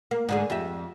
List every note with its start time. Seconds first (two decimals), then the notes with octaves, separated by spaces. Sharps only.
0.11 A#3
0.29 G#2 D3 G#4
0.50 F2 G4 E5